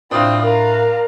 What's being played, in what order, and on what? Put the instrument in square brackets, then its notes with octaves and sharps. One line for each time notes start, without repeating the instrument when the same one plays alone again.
[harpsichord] A2 [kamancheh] C4 [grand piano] D4 F4 [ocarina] D#6
[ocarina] A#4 [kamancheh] F5 A#5